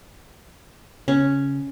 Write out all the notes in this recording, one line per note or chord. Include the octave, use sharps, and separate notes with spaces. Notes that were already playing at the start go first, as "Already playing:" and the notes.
C#3 C#4